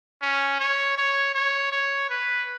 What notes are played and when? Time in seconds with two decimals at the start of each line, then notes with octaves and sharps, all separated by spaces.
0.22 C#4
0.60 C#5
0.98 C#5
1.35 C#5
1.72 C#5
2.10 B4